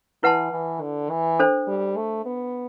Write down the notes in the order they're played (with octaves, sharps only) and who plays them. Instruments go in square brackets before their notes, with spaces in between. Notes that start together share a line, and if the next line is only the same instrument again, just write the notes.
[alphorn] E3 [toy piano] E4 B4 F#5 A5 C6
[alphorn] E3
D3
E3
[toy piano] D4 A4 C5
[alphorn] G3
A3
B3